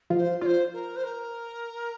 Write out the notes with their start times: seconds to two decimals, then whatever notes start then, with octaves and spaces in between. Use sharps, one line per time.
0.10 F3 F4
0.17 C5
0.41 F3 F4 C5 D5
0.73 A#4
0.96 C5
1.04 A#4